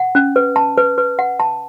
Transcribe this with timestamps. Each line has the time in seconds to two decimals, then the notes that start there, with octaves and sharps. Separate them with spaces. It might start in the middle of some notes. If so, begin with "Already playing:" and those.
Already playing: F#5
0.15 C#4
0.36 B4
0.56 A5
0.77 B4
0.98 B4
1.19 F#5
1.40 A5